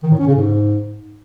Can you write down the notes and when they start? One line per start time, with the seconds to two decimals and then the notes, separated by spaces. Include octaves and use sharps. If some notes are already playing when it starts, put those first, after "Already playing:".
0.03 D#3
0.11 A2
0.19 C#4
0.27 C#3
0.35 G#2